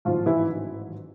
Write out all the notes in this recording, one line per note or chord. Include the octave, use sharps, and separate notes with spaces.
A1 G#2 D#3 F3 F#3 F4
E3 E4